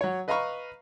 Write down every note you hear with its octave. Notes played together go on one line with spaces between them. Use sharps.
F#3 C#5
B4 D#5 F5 A#5 B5 C#6